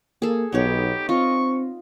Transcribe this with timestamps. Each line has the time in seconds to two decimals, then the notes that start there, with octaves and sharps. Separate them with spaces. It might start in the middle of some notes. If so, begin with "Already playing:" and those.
0.22 A#3 G#4 A4
0.52 B1 B3 D#4 G4 C#5
1.09 C4 F4 D#5 C#6